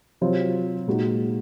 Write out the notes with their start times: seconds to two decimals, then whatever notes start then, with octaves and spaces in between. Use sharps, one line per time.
0.21 C3 F#3 C4 F4
0.87 A#2 G#3 D#4 F#4